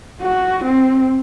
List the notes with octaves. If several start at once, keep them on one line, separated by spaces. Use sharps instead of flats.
F#4
C4